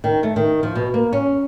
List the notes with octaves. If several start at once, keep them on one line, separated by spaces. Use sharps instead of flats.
D#3
A3
D#3
F3
B2
A#3
C#4